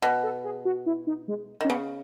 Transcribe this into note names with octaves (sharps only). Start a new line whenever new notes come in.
B2 B4
A4
G#4
F#4
E4
D#4
G#3
D#3
C#4
C#3 B3